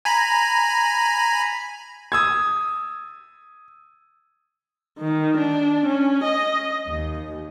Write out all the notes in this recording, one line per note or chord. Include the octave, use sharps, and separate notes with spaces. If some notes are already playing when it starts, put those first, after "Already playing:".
G#5 A#5 B5
D#6 E6 G#6
D#3
D4
C#4
D#5
D#2